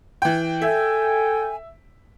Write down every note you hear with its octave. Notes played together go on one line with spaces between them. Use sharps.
E3 G5
A4 E5 G5 G#5